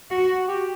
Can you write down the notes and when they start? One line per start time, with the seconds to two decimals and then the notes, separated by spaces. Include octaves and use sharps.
0.11 F#4
0.30 F#4
0.48 G4